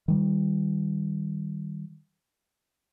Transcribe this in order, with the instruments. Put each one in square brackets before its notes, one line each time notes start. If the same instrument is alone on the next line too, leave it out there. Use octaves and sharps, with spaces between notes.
[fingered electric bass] D#3 G3